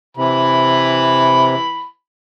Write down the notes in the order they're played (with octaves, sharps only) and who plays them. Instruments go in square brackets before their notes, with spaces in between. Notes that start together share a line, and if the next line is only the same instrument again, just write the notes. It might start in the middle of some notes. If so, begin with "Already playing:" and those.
[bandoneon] C3 [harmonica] E3 B5